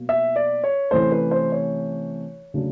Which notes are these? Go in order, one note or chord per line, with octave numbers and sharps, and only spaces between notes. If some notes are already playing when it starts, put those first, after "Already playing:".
Already playing: B2 F#3 A#3
E5
D5
C#5
C3 E3 A3 C#4 C5
B4
C5
C#5
C#3 F#3 A3 D4